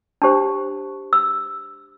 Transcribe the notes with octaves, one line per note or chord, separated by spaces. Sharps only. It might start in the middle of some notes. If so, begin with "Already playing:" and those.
D4 G4 C5 A5
E6